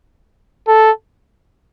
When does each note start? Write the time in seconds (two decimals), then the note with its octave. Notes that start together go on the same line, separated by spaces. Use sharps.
0.68 A4